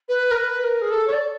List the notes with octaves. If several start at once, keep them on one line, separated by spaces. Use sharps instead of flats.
B4
A#4
B4
A#4
G#4
A4
C#5
D5